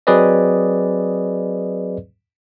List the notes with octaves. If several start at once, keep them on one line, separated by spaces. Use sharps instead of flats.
F#3 C4 G#4 B4 D5 D#5